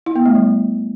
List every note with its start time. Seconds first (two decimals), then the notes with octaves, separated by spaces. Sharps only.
0.06 E4
0.16 B3
0.25 A3
0.35 G3